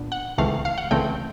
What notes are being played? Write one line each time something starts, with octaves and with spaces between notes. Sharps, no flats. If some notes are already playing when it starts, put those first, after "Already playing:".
Already playing: A#2 B3 D4
F#5
C#2 C#3 E3 A3 C4 F5
F5
F#5
C#2 C#3 E3 A3 C4 G5